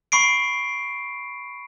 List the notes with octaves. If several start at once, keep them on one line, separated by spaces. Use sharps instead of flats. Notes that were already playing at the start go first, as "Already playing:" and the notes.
B5 C#6 C7 D7